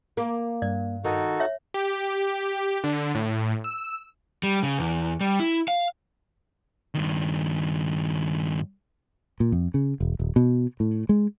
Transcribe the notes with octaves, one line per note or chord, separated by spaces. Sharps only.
A#3
G2 D5
D#3 D#4 F#4 A4
C#5 E5
G4
D3
A2
E6
G3
C#3
E2
G3
E4
F5
G2 D#3
A#2
F2
C#3
E1
D#1
B2
A2
G#3